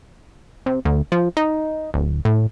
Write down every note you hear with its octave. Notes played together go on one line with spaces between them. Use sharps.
C3
D2
F3
D#4
D1
A2